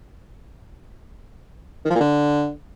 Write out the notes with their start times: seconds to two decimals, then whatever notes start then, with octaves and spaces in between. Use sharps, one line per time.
1.85 D#3
1.90 F3
1.95 A#2
2.00 D3